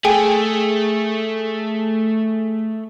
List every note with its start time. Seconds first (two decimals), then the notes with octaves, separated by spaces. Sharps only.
0.05 A3 G#4 G5 G#5